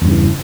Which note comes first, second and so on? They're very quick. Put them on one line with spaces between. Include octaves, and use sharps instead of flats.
E2 G2 C#3 E3